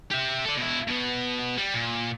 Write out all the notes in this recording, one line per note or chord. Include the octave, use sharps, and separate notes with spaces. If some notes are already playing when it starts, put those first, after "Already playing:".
G4 E5
A4 D5
B2 E4
B2 B3
G3
A#2